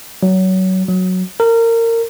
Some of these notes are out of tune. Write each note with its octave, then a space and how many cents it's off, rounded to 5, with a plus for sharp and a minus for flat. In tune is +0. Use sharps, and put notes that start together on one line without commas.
F#3 +20
F#3 -5
A#4 -25